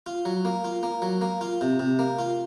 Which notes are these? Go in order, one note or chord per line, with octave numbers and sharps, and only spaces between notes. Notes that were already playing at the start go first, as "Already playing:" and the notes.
F4
F#3
A#3
F4
A#3
F#3
A#3
F4
C3
C3
A#3
F4